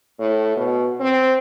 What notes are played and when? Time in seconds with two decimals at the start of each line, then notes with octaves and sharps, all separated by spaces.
0.19 A2
0.57 B2
1.00 C4